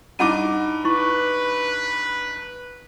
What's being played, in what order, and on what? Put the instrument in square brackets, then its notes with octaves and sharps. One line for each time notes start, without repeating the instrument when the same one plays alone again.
[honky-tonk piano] G2 D#4 D6 [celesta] E4 F#5 D#7
[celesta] E4 C#6 [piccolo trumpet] B4